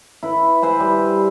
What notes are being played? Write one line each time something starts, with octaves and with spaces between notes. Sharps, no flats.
E4 B4
B4 C5 E5 G#5
G3